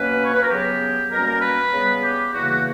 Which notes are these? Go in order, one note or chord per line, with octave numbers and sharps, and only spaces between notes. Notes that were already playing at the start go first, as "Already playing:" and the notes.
Already playing: B2 F#3 A#3 C#4 B4
C#5
B4
A#4
C#3 F#3 B3 G4
B2 G3 A#3 C#4 A#4
A#4
B4
C#3 G3 B3
G4
E2 C#3 E3 A#3 F#4